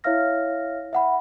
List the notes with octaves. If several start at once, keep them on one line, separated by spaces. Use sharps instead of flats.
E4 C#5 E5 F5 F6 A#6
E5 F#5 B5